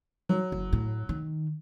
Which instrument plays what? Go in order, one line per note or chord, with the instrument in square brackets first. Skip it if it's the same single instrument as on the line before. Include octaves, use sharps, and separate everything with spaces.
[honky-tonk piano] F#3
[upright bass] F#1
A2
D#3